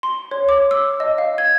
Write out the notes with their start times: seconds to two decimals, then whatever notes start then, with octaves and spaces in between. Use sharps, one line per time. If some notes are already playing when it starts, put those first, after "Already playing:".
0.03 C6
0.31 C#5
0.49 D6
0.71 E6
1.00 D#5
1.18 F5
1.38 G#6